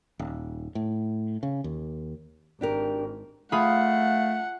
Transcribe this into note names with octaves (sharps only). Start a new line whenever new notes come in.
D#1
A2
C#3
D#2
G#1 D4 G4 A#4
A3 F4 G#4 F5 F#5 B5